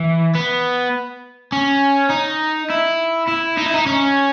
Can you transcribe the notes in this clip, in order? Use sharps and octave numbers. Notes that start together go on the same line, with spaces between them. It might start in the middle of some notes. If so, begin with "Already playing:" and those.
Already playing: E3
B3
C#4
D#4
E4
E4
D#4
E4
D#4
C#4